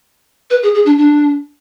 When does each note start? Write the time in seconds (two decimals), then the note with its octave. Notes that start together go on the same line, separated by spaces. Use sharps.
0.50 B4
0.63 G#4
0.74 G#4
0.86 D4
0.98 D4